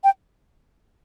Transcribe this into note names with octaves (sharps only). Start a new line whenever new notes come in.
G5